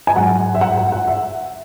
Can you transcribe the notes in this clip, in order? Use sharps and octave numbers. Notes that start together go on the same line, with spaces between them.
G#5
G#2 F#3 F#5
E5
F#5
F#5
F#5
E5